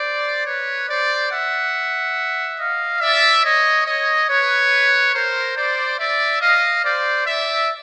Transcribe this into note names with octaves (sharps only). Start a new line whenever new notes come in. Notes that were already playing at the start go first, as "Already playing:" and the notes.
Already playing: C5 D5
B4 C#5
C5 D5
E5 F#5
D#5 F5
D5 E5
C#5 D#5
C#5 D#5
B4 C#5
A#4 C5
C5 D5
D5 E5
D#5 F5
C5 D5
D5 E5